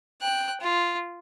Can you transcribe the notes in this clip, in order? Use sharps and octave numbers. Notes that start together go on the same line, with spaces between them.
G5 F#6
F4